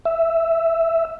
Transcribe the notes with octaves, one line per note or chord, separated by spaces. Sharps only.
E5